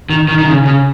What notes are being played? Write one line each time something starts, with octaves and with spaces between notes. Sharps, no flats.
D#3
D#3
D#3
C#3
C#3